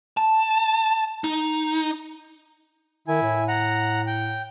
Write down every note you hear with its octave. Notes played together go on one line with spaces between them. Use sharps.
A5
D#4
D#3 E4 G#5
A2
F#5 A#5
G5